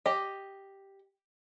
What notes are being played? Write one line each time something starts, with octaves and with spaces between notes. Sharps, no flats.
G4 D#5